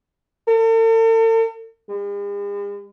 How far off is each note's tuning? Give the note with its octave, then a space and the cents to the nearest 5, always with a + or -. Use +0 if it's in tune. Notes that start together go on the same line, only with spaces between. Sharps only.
A4 +45
G#3 -45